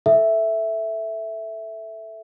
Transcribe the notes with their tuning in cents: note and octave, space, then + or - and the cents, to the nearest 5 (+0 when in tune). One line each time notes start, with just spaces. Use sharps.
A4 +0 E5 +0